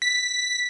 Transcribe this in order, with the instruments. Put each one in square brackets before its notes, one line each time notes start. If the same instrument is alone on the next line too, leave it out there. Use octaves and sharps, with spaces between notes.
[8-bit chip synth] B6